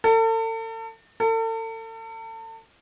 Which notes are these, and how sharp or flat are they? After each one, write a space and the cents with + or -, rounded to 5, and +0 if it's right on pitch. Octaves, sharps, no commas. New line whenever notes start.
A4 +40
A4 +40